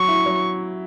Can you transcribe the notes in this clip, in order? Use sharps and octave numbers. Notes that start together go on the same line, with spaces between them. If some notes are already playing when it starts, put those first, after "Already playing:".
Already playing: F#3 C#6
E4
F#3